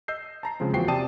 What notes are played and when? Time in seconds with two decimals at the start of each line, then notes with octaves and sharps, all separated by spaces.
0.08 D#5 E6 G6 C7
0.43 A5 A#5 C7
0.60 C#3 F3 G#3 C4
0.73 E2 F3 A#3 F#4 G5 C7
0.88 C3 D5 G5 A5 D#6 D#7